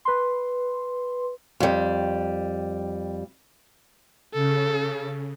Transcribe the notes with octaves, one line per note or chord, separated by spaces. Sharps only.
B4 C6
F2 G3
C#3 A4